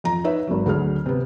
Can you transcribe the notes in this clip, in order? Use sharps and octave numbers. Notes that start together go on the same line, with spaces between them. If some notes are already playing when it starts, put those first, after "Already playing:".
F2 A#5
D#4 B4 C#5 E5
G#1 F#3
D2 F#3 G#4 F6
C3 B3